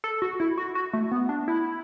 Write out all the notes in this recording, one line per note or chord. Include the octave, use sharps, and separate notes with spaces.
A4
F#4
E4
F#4
F#4
A3
B3
D4
E4